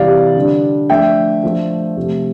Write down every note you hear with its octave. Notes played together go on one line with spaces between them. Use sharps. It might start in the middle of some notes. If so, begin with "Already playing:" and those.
Already playing: C3 E3 G3 D5 F5
D3 G3 D4
F3 A3 D4 E5 G5
F3 A3 D4
C3 F3 A3